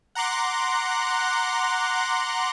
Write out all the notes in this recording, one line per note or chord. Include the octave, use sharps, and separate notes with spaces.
F#5 A#5 C6 D6 F#6